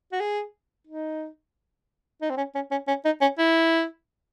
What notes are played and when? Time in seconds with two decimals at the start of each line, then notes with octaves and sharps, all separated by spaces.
0.12 F#4
0.20 G#4
0.87 D#4
2.22 D#4
2.30 C4
2.37 C#4
2.55 C#4
2.71 C#4
2.88 C#4
3.05 D#4
3.21 C#4
3.39 E4